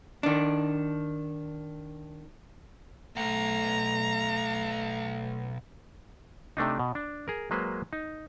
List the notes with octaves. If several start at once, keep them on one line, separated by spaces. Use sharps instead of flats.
D#3 D4
B1 A3 A#5
C3 A3 D4 D#4
B2
D4
G#4 A#4
F#3 G#3 A#3 B4 C5
D#4